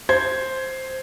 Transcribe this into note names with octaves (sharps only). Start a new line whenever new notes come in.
C5 G#6